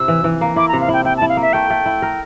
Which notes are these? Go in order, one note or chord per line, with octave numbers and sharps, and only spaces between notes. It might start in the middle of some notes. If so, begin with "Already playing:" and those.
Already playing: C3 E4 E6
E3
E3
A#3
E4 D6
A#5
C3
F5
E4 G5
E4 G5
A5
E4
F5
A#3 E5
A3 G5
A3
E4
A#4